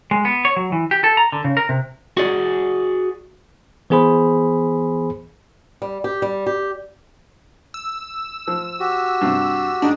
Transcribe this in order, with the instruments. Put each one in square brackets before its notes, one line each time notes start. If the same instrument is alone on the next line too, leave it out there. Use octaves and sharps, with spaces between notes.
[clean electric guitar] G#3
B3
C#5
F#3
E3
G4
A4
A#5
D3
C#3
A#4
C3
[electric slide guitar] F#4 G#4 D5
[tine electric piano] E3 B3 G#4 C5 B5
[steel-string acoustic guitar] G3
G4
G3
G4
[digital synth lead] E6
[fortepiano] F3
[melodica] F#4 G4
[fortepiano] G2 C3
[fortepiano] G#2 D#4 [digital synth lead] D4